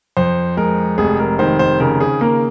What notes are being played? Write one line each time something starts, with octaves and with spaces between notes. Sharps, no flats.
F2 C5
G#3 A#4
F1 G#4
A#4
D#3 C5
C5
C#3 A#4
G#4
A#3 A#4